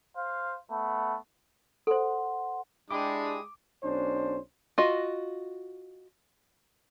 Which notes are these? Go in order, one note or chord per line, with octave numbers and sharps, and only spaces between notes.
C5 F5
A3 B3
A4 C5 F#5 C6
G#3 D4 E4 G4 D6 D#6
B1 C#4 D4 C5
F4 F#4 D#5